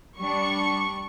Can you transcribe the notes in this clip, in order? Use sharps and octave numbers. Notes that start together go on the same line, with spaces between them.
G3 D4 C#6